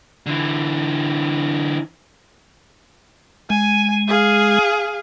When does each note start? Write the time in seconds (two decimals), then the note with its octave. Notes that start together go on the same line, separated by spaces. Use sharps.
0.26 D3 E3
3.50 G#3 G#5
4.08 G#4 F5